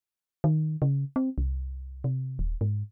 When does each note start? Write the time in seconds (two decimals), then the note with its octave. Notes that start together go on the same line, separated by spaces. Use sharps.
0.44 D#3
0.82 C#3
1.16 C4
1.38 C2
2.04 C3
2.39 D#1
2.61 G#2